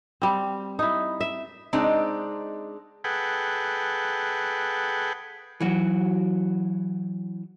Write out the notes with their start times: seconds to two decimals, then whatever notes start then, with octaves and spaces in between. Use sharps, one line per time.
0.22 G3 C4
0.79 D#4 E4
1.21 E5
1.73 G#3 C4 D4 D#4
3.04 G#4 A4 B4 F#5 G5
5.60 E3 F#3 F#4